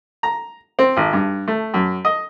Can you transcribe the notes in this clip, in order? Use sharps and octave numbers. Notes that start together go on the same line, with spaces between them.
A#5
C4
G#1
G2
A3
F#2
D#5